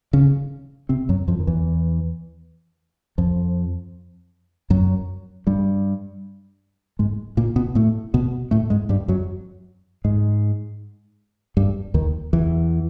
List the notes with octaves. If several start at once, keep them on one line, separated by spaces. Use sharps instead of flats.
C#3 C#4
C3 C4
F#2 F#3
F2 F3
D#3
E2 E3
F2 F3
F#2 F#3
G2 G3
G#2 G#3
A#2 A#3
B2 B3
A2 A3
B2 B3
A2 A3
G#2 G#3
G2 G3
F#2 F#3
G#2 G#3
G2 G3
D#2 D#3
E2 E3